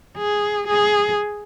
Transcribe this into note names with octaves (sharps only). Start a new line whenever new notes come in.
G#4
G#4